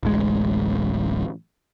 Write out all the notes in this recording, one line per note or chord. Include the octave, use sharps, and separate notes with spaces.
D1 A1 G#3